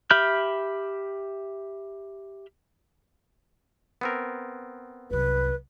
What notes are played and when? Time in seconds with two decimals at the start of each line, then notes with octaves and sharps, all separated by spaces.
0.11 G4 E5 B5 F6 G6
4.01 B3 C4 A#4
5.10 C2 F#2 B4